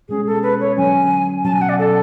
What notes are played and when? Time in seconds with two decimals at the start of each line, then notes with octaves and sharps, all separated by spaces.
0.09 B2 G#3 C#4 G#4
0.27 A4
0.43 B4
0.60 C#5
0.77 D3 F#3 C#4 G#5
1.44 B2 F#3 C#4 A5
1.53 G#5
1.61 F#5
1.69 D5
1.79 A4